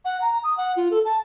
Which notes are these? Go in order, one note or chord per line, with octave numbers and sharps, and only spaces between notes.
F#5
A#5
D#6
F#5
F4
A4
A5